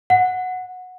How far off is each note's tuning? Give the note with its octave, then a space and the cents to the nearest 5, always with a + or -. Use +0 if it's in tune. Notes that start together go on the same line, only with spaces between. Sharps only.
F#5 -10